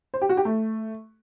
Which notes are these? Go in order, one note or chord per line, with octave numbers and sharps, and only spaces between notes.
C5
G4
F#4
G4
A3